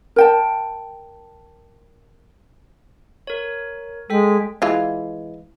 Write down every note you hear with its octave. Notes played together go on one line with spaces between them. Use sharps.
A#4 G5 A5
A#4 C#5
G#3 A4 G5 B6
E3 G#3 F4